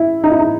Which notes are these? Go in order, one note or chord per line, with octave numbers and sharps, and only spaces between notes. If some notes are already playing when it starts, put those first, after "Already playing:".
Already playing: E4
D#4
E4
D#4